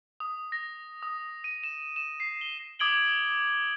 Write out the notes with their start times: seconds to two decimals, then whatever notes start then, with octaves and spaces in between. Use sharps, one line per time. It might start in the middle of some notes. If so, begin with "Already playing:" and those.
0.20 D#6
0.52 A#6
1.03 D#6
1.44 D#7
1.64 E7
1.96 E7
2.20 C7
2.41 G7
2.79 D6 D#6 G#6 D7 F#7 G7